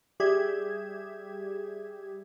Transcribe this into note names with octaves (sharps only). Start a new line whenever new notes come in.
G3 G4 G#4 E5 G#6